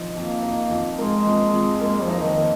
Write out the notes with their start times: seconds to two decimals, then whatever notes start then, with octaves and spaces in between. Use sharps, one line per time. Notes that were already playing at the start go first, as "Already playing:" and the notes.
Already playing: F3 D#4
0.16 F2 A#3
0.43 D#4
0.71 F2
0.98 G#3 A#3
1.26 F2
1.54 F2
1.81 G#3 A#3
2.02 F3
2.09 D#4
2.23 D#3
2.37 A#3